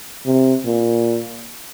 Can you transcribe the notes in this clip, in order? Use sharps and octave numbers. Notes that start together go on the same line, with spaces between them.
C3
A#2